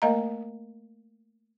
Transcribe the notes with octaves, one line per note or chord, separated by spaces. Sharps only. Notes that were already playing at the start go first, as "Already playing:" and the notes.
A3 A#3 A#4 D#5 F5 A#5